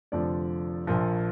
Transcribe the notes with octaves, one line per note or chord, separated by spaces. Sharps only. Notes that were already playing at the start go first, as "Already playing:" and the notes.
F1 F2 D3 F3 D5
A#1 A#2 F3